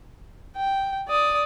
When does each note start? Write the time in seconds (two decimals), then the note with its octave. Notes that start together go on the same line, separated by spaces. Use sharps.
0.56 G5
1.08 D5 D#6